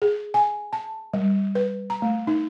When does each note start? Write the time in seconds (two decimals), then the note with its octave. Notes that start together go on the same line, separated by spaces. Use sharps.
0.02 G#4
0.34 G#5
0.73 A5
1.14 G3
1.55 B4
1.90 A#5
2.02 A3
2.27 D#4